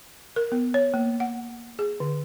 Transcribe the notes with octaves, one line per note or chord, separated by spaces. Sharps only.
A#4
B3
C#5
A#3
F#5
G#4
D3